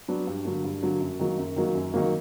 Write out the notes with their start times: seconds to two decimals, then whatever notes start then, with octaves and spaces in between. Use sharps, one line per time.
0.08 F#3 B3 D4
0.27 G2
0.45 D3 F#3 A#3
0.64 G2
0.82 D3 F#3 A#3
1.01 F#2
1.19 D#3 F#3 A#3
1.38 F#2
1.56 D#3 F#3 A#3
1.75 F#2
1.94 D#3 F#3 A#3